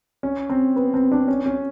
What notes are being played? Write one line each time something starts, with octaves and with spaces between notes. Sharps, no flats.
C#4
C4
B3
C4
D4
C#4
C#4